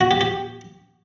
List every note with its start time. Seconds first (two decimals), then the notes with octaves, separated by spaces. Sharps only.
0.01 F#4
0.11 G4
0.21 G4